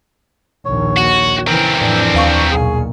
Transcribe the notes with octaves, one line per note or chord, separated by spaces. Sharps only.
A#1 D#2 C#5
F#4
C#3 E3 C4 A#4
F2 A2 E3 D4
D#2 F5 C#6
B1 A#2 G#4